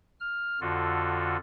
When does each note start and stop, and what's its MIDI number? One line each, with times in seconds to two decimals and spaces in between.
0.20 0.59 89
0.61 1.37 41
0.61 1.37 50
0.61 1.37 65
0.61 1.37 66
0.61 1.37 69